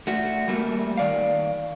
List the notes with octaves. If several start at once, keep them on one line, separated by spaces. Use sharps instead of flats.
A3 F#4
G3 A3 A#3
D#3 D5 F5